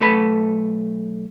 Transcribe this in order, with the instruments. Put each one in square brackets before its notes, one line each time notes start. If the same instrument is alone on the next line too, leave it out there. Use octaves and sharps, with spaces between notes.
[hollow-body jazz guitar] B1 A3 A4 B4 B5